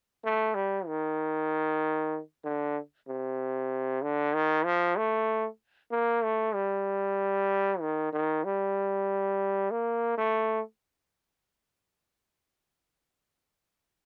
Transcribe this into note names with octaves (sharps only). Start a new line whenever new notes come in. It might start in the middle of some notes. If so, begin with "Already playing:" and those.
A3
G3
D#3
D3
C3
D3
D#3
F3
A3
A#3
A3
G3
D#3
D#3
G3
A#3
A3